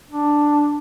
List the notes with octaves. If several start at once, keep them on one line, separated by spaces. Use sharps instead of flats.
D4